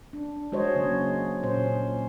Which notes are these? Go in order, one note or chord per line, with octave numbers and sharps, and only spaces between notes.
D4
G#3 F#4 C5 C#5 D#5
C#3 F#3 A#3
A#2 C#4 C5